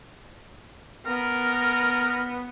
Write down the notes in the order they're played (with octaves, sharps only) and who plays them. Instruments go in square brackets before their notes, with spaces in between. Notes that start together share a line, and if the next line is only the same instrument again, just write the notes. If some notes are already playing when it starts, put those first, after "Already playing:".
[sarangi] B3 [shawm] A#4